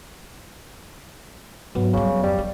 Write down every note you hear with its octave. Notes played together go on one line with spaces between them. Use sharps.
G#2 F#3 B3
C#3 G3 C4
F2 G3
F4